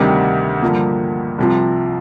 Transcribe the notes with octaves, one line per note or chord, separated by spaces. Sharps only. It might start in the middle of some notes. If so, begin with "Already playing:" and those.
Already playing: D2 C3 D#3 G3
G2 D3 F3 A#3
C2 C3 F3